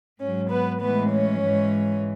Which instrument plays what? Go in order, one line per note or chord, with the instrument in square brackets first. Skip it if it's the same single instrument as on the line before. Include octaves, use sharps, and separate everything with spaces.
[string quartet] G#2 F#3 C#4
B3 B4
A2 E3 G#3 B3 B4
C#4 C#5
G#2 E3 G#3